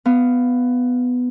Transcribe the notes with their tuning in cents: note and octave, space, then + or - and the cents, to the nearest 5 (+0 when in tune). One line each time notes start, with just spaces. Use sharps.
B3 +10 F5 +0